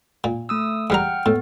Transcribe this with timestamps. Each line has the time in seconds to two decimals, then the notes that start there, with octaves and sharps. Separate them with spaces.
0.24 A#2
0.49 A3 D#6 E6
0.90 E2 G3 F#5 G5 A#5 F6
1.26 A2 B3